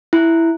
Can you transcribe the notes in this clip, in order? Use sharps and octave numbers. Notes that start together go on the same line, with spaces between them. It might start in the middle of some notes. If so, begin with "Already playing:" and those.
E4